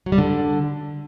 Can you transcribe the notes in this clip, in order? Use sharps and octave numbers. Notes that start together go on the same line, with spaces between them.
F#3
G3
D3